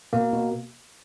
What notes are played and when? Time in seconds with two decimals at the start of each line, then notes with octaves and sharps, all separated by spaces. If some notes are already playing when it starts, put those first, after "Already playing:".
0.13 B2 A#3
0.33 B2